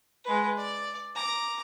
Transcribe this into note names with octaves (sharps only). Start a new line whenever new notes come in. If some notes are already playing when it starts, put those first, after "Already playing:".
G#3 B4
D5
A#5 D6